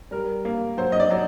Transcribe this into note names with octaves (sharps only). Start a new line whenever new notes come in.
G3 A#4
A#3
F#3 C5
D#5
D5
F#3